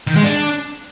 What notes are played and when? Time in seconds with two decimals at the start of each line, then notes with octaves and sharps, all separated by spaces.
0.07 D#3
0.15 G#3
0.24 D4